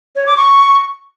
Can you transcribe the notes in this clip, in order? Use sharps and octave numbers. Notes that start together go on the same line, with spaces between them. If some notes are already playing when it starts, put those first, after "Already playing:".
C#5
D6
C#6